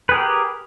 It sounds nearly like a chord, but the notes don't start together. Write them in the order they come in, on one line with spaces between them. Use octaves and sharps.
B4 G#4 A#4 G4